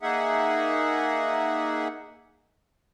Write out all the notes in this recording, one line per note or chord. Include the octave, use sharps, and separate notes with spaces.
A#3 D#4 G#4 E5 F#5